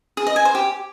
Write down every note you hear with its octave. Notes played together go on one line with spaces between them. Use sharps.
G#4
D#5
G#5
C5
G4